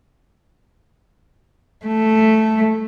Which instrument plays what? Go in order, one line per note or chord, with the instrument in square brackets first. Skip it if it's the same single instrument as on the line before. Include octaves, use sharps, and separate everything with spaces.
[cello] A3